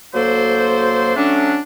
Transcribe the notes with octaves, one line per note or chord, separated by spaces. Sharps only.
D2 F#3 A#3 A4 C5
F#3 A3 C#4 D4